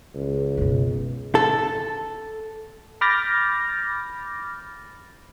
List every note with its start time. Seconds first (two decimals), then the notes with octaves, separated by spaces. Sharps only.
0.14 C#2
0.57 F#1 B2
1.35 A4
3.01 B5 D6 F6 G6 A6 A#6